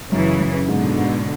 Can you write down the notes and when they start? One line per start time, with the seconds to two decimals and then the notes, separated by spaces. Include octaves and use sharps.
0.12 F#2 C#3 E3
0.40 F#2
0.67 G#2 B2 D3
0.96 G#2